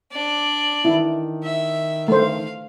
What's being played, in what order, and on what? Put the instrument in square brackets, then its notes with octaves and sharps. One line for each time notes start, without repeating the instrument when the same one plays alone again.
[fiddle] D4 D5
[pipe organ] D#3 [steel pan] E4
[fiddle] E5
[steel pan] A3 C5 [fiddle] F5